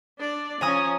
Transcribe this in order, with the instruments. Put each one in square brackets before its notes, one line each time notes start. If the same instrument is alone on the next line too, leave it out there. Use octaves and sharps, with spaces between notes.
[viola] D4 D5
[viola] F3 C#4 [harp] G#5 A#5 D#6